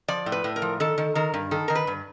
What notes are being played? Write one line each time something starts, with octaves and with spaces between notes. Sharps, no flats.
F3 D5
A2
B4
A2
A#4
F3
D#3 A4
D#3
D#3 A#4
G2
D#3 A4
D#3 A#4
B4
G2